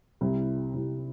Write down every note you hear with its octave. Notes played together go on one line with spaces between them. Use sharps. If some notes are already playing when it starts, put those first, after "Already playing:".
C2 C3 G3 E4
C2 C3 G3 E4